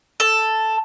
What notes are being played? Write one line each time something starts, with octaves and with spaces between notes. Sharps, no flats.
A4